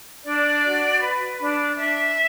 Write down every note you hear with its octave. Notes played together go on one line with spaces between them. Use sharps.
D4 D5
F#4
B4
D4
D4 E5